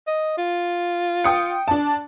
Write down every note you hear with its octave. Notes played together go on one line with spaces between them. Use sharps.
D#5
F4
G5 D#6 C#7
D4 A5